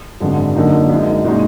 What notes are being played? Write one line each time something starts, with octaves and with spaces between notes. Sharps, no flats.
G#1 F#2 D3 F3 G#3
F#2 D3 F#3 A#3 D#4
F#2 F3 G#3 D#4
A#2 G#3 D#4 F#4